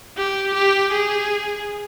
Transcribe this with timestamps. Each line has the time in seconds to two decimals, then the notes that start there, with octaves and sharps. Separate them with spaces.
0.18 G4
0.54 G4
0.92 G#4